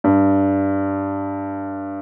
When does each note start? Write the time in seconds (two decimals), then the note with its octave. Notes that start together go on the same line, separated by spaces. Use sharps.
0.04 G2